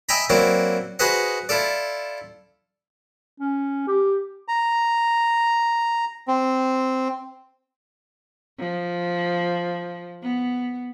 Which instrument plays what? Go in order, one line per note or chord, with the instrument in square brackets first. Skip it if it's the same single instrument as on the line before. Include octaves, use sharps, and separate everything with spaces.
[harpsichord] D#5 E5 G5 G#5 A#5 B5
F#3 A#3 C4 E4 D5
F#4 G#4 B4 C5 D#5 F#5
E4 F4 A4 D5
[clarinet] C#4
G4
[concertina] A#5
C4
[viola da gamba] F3
B3